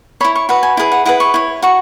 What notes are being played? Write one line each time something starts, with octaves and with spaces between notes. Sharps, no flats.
E4 C#5 B5
C#6
F#4 B4 B5
G#5
E4 G#4 B4
F#5
E4 G#4 B4 F#5
C#6
E4 C#5
F#4 C#6